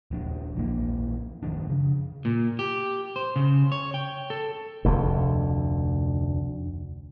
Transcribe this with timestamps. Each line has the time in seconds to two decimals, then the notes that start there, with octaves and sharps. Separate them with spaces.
0.11 D#1 F3 D4
0.56 A#1 E3 A#3
1.43 F#2 D#3 F3 D4
1.69 C#3
2.25 A#2
2.59 G4
3.16 C5
3.36 C#3
3.72 C#5
3.94 G5
4.30 A4
4.85 F1 D2